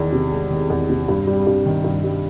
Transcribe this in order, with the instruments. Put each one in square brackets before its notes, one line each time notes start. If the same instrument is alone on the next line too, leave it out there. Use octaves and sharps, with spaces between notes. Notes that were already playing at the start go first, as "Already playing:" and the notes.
Already playing: [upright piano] E2 D#3
C3
G#3
D#3
E2
C3
G2
G3
G2
D#3
G2
G3